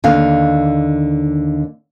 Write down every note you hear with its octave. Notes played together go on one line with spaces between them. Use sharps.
D#2 D3 F5